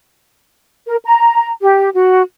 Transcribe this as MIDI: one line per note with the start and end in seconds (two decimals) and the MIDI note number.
0.87 0.98 70
1.04 1.49 82
1.61 1.89 67
1.94 2.21 66